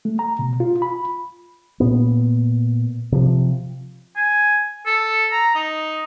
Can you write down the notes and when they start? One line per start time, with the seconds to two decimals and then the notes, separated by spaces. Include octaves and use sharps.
0.05 A3
0.19 A#5
0.39 B2
0.60 F4
0.82 B5
1.80 A#2 B3
3.12 C3 F3
4.16 G#5
4.86 A4
5.32 A#5
5.55 D#4